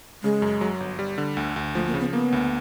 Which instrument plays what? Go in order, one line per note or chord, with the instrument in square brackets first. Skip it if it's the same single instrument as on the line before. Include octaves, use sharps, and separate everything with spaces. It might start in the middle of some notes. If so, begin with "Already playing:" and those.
[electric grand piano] C#3 [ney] G#3
[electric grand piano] F#2
F#3
G1
G3
D3
D2
D2
[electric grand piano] F3 [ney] A3
[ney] A#3
[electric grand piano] C#3
[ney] B3
[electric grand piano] A#3 [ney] B3
[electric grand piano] D2